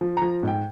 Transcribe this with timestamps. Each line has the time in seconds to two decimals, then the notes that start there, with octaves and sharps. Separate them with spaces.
0.01 F3
0.17 F3 A#5
0.43 G#2 G5